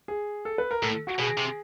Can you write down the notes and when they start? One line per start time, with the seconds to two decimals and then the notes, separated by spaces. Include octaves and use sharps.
0.08 G#4
0.45 A4
0.58 B4
0.71 A#4
0.82 A2 A4
1.07 F#4
1.19 B2 G#4
1.37 C3